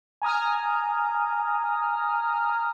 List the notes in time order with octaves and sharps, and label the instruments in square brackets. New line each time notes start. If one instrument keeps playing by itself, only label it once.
[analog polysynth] G#5 A#5 D#6 F6